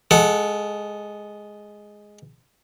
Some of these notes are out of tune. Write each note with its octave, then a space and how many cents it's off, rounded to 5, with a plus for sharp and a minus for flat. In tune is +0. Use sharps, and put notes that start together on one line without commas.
G#3 +0 A4 -20 F#5 +0